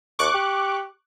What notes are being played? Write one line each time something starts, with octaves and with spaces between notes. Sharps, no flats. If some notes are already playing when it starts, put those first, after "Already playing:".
D#2 C#6 D6 F#6
G4